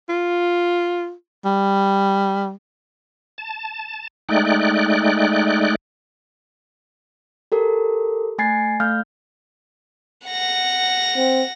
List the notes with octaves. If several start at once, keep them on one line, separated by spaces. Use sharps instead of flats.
F4
G3
A5
G#3 A3 D#4 D5 G5 F#6
G4 A4 A#4
A3 G#5 G#6 A6 C7
A3 F5 F6 G6
F#5 A#6
C4